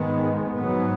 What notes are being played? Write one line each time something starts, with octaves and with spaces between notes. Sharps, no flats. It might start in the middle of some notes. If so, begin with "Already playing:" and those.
Already playing: G#2 D#3 G#3 B3
G#2 F#3 B3